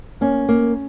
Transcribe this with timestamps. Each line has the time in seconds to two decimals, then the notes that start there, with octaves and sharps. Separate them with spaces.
0.21 A#3 C#4
0.49 A#3